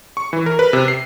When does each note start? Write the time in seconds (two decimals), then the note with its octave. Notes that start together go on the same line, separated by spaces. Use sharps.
0.17 C#6
0.33 E3
0.46 A#4
0.59 B4
0.73 C3
0.88 C7